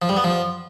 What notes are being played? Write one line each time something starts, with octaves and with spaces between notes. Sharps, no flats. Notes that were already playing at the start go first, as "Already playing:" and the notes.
F3
G3
B3
F3